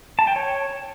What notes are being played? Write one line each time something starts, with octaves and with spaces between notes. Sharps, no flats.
A5
G5
C#5